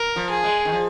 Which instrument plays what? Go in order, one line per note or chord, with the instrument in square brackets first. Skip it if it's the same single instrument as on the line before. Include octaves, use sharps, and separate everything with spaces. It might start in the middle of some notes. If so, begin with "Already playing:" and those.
Already playing: [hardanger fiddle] A#4
[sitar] F3
[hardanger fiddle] G#4
[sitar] G#3
D#3
F3